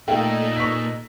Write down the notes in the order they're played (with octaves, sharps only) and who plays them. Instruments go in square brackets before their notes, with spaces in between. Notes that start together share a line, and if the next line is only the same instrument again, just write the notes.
[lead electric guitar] A#2 [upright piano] A3 [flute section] D#4 A4 E6 [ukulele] D#5 F5 G5
[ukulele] B4 A#5 [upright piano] C#6 B6